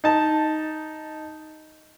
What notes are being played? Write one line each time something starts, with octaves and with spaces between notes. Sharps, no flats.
D#4 A5